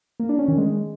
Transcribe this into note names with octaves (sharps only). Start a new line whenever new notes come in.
A#3
D4
C#4
D#3
G#3